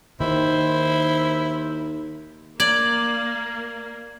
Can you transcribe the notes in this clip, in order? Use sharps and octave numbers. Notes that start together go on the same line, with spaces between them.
D#2 D#3 E4 C5
A#3 D5 G#6 F#7